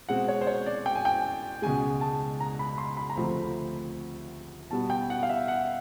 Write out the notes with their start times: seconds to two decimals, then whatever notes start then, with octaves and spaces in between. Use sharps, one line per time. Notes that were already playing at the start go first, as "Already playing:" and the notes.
0.09 B2 G#3 C4 F#5
0.28 C#5
0.41 C5
0.47 C#5
0.66 D5
0.86 G5
0.95 G#5
1.05 G5
1.62 C#2 B2 G#3 G#5
2.01 A5
2.40 A#5
2.59 B5
2.78 C6
2.97 B5
3.10 A#5
3.16 D2 C3 F3 A3 C4 B5
4.71 B2 G3 B3 A5
4.90 G5
5.10 F#5
5.23 F5
5.29 E5
5.48 F#5